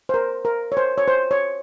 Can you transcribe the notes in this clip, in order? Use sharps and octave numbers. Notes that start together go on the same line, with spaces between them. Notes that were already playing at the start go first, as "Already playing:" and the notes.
C5
A#4
A#4
C#5
C5
C#5
C5
C#5